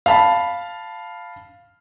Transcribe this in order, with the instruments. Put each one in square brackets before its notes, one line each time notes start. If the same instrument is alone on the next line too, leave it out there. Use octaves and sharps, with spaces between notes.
[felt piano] F5 A5 B5